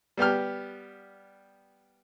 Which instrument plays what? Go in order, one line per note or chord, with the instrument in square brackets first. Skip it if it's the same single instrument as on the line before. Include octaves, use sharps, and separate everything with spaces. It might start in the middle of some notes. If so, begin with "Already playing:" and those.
[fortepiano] G3 B3 G4 F6